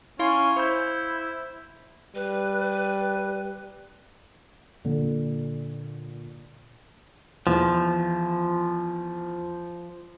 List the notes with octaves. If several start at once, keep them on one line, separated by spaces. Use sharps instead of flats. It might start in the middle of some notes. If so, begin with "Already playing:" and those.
C#4 E4 F5 C6
E4 C5 G6
G3 B4
A#2 D3
E2 F3